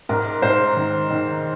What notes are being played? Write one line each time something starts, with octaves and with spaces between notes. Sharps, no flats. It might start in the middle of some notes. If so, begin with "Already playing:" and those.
G#2 A#4
G#2 C5
D#3
D#3